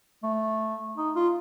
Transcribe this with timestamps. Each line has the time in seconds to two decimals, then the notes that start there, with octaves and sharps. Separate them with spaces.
0.24 A3
0.98 D#4
1.16 F4